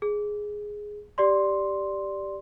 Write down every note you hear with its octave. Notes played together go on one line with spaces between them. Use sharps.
G#4
G4 D5 C6